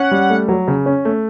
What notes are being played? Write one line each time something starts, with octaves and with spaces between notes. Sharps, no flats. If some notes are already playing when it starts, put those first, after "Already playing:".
Already playing: C#4 F#5
G3
A3
F#3
C#3
C#4
A3